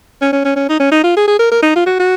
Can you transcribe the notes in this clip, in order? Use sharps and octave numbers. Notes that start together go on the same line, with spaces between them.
C#4
C#4
C#4
C#4
D#4
C#4
D#4
F4
G#4
G#4
A#4
A#4
D#4
F4
F#4
F#4